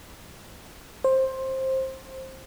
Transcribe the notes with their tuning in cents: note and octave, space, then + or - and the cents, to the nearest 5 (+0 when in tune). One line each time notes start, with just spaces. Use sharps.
C5 +15